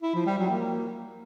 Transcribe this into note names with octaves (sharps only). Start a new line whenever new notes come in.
E4
F3
G3
F#3
A#3